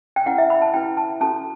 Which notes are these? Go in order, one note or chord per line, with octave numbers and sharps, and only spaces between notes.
G5
C#4 E4 B4 F#5
E5
B5
A5
C#4 E4 B4 G5
A5
C#4 F#4 A4 A5